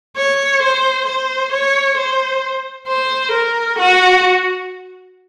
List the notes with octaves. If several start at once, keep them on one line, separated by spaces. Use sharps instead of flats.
C#5
C5
C5
C#5
C5
C5
A#4
F#4